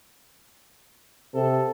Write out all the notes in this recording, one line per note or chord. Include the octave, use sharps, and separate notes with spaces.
C3 A4